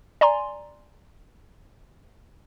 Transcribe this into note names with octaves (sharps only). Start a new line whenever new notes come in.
D5 G#5 A#5 C6